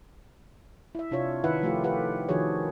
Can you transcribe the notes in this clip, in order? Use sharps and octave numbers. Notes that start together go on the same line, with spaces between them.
E4 E5
C3 D4 F4 C#5
D#3 D#4 E4 B4 E5 F#5
F3 A3 F4 G4
F4 G4 A4 B4 F#5
D#3 F3 D4 F#4 G#4 C#5